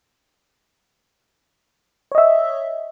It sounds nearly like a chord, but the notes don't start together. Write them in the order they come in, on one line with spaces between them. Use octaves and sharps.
C#5 D#5 E5